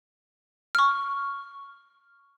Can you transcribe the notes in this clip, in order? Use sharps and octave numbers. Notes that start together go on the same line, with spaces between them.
C#6 F6